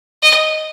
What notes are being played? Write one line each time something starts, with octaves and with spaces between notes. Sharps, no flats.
D#5